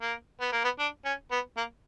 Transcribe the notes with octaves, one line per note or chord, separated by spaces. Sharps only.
A#3
B3
A#3
B3
D4
C#4
B3
A#3